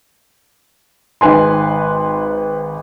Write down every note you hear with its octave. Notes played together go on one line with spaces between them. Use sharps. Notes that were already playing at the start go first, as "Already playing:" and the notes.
G#1 G#2 D#3 B4 G#5 C6